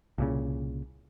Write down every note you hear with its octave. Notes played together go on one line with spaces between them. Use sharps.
C2 A#2 C#3